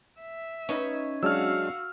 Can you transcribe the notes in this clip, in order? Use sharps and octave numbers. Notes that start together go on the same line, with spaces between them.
E5
C#4 D#4 B4
F#3 G#3 D4 F#4 F5 E6 F6